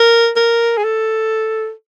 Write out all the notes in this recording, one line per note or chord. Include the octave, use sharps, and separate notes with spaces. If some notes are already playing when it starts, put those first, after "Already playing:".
Already playing: A#4
A#4
G#4
A4